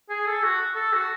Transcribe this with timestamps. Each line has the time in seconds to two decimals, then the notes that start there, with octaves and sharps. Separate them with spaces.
0.09 G#4
0.26 A4
0.43 F#4
0.76 A4
0.93 F#4